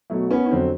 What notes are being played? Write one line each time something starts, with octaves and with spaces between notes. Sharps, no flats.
B2 F#3 A3
B3 C#4
C#4
F2 D3 F#3 C4